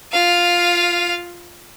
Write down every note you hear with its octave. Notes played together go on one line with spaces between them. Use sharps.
F4 F5